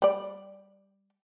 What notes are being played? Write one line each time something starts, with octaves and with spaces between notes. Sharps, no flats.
G3 D5